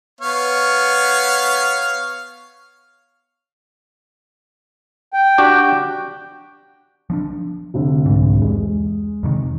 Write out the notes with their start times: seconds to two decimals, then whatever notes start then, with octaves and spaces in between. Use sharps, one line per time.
0.21 B3 C#5 F5
5.13 G5
5.38 D4 F#4 G4
7.10 F3 C4 D4
7.74 F1 D3
8.06 C2 G#2
8.42 E2 G#3
9.23 F2 C3 D#3